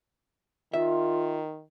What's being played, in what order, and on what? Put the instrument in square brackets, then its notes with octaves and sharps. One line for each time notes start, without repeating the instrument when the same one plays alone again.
[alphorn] D#3 [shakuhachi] F4 [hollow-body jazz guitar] E5